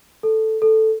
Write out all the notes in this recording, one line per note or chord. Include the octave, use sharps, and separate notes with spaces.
A4
A4